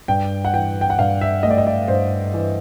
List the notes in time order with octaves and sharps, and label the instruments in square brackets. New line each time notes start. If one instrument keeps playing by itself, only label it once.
[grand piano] G2 G5
F#5
E3 G5
G5
F#5
G2 F5
E5
A3 D#5
D5
D#5
D5
G2 C5
E3